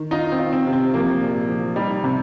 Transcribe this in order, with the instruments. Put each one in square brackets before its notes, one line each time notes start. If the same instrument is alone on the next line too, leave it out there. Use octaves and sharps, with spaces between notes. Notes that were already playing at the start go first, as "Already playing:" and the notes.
Already playing: [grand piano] D#3
[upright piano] D#4 [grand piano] F4
[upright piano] C4
[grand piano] F4
[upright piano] C4
[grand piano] C3
[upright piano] C4
[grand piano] F3 [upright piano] A#3
[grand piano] A#1
F3
[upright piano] G3 [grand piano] D#4
[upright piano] C3